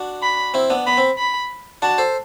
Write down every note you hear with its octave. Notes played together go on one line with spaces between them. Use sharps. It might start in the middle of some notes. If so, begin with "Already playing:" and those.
Already playing: D4 F#4
B5
C4 E4
B3 D4
B3 B5
C4
B5
D4 F#4 A5
A4 C5